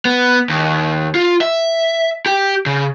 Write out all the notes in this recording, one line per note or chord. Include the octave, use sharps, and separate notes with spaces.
B3
D#2
F4
E5
G4
C#3